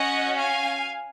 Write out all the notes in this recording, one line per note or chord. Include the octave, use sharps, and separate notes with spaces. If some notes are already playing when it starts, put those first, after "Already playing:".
Already playing: C#4 F#4 D#5 F#5
F5 G#5